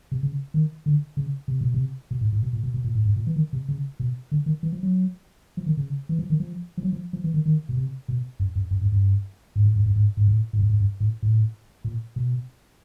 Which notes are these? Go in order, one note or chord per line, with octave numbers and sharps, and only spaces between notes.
C3
C#3
D#3
D3
C#3
C3
B2
C3
B2
A2
A2
B2
A#2
B2
B2
A#2
A2
G#2
A#2
E3
D#3
C3
C#3
B2
D3
D#3
E3
F3
F#3
F3
D#3
C#3
E3
F3
D#3
F3
F3
F#3
F3
F3
E3
D#3
D#3
B2
C3
B2
F#2
F#2
F#2
G2
G2
G#2
A2
G#2
G2
G#2
G#2
A2
A2
G#2
G#2
G2
A2
A2
A#2
B2